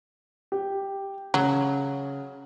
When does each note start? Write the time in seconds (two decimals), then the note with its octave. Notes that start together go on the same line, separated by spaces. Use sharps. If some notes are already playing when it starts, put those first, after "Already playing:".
0.52 G4
1.34 C#3 F#3